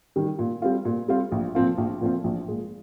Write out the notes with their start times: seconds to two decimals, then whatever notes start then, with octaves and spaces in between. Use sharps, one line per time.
0.16 D#3 G3
0.39 A#2
0.62 G3 C4 F4
0.85 A#2
1.08 G3 C4 F4
1.32 A#1
1.55 A#2 F3 C4 F4
1.78 A#1
2.01 A#2 F3 C4 F4
2.24 A#1
2.48 A#2 G#3